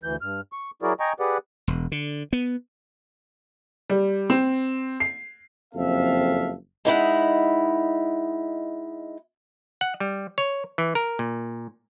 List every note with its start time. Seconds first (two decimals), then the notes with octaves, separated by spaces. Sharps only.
0.03 D2 E3 G6
0.21 G2 F6
0.53 C#6
0.82 F#3 E4 F#4 G#4 A#4 D5
1.00 D#5 G5 G#5 A#5 C#6
1.20 G4 G#4 B4 D5 F#5
1.68 E1
1.92 D3
2.33 B3
3.90 G3
4.30 C4
5.00 C7
5.74 F#1 F2 C4 A4 E5 F5
6.85 G#3 D#4 E4 F#5
9.81 F#5
10.00 G3
10.38 C#5
10.78 E3
10.95 A#4
11.19 A#2